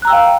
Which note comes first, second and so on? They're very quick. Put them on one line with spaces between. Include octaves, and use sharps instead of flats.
F#6 A#5 E6 G5 F5